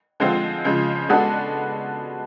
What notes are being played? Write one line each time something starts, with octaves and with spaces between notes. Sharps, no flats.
D3 F3 G#3 C4 F4
C#3 F3 G#3
G#3 B3 D4 F#4 A4